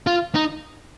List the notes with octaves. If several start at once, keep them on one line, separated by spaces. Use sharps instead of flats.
F4
D#4